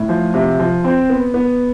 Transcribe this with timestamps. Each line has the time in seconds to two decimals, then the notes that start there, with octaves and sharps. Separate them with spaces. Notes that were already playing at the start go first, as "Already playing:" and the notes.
Already playing: A2
0.09 F3
0.34 C3
0.60 F3
0.84 C4
1.10 B3
1.34 B3